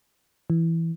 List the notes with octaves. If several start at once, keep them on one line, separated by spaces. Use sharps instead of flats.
E3